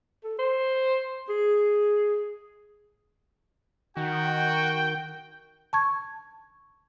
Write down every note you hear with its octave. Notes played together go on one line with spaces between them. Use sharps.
A4
C5
G#4
D#3 F#4 G5
A5 C#6 G#6